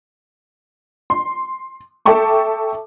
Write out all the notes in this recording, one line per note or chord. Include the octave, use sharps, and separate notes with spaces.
C6
A4 E5 G5 A5 C#6 D6